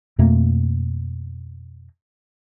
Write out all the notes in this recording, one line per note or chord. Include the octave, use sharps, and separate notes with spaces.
F2 B2 A3 A#3